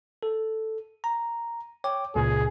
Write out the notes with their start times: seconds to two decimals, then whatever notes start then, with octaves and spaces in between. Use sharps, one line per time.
0.23 A4
1.04 A#5
1.84 C#5 G5 D6
2.15 C#2 A#2 C#3 G#4